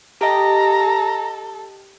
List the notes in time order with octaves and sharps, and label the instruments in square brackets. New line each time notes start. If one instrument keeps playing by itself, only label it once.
[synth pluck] G4 D#5 [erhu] A4 [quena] A#5